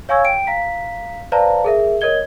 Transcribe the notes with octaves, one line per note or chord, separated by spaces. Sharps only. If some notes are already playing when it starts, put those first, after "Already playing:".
C#5 F5 G#5 C#6 E6 G#6
G5 D7
F5 A#5 B6
B4 C5 D5 F5 A5 A#5
G#4 A#4 E5
A#4 C#5 D#5 G#6 G7